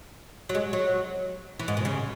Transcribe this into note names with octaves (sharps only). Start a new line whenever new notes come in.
F#3
G#3
F#3
E3
G#2
B2
C#3